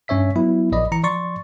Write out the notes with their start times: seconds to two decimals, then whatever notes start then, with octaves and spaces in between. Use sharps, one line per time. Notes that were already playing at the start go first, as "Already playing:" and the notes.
0.08 G2 C#4 C#5 E5 B6
0.36 F#3 B3 E4
0.72 A#1 D5 D#5 B5
0.92 E3 A#5 C#7
1.03 F3 D5 C6 C#6 A6